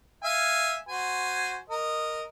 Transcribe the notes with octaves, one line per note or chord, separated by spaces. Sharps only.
E5 F5 G#5
F#4 C5 G#5
A#4 D#5